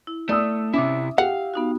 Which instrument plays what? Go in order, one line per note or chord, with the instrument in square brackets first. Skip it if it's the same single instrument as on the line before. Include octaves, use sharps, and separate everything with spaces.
[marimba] E4
[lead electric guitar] A3 [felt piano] D5 D#6 E6
[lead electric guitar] C3 E4 [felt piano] C#4 [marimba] E5 D6
[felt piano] G4 [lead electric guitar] F5 [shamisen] F#5
[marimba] B3 D#4 F#4